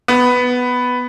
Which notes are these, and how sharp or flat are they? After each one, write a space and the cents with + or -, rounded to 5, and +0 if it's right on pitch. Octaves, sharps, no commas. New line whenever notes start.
B3 +5